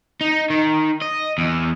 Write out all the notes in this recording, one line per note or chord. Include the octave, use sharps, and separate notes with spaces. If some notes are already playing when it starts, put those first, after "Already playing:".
D#4
D#3
D#5
E2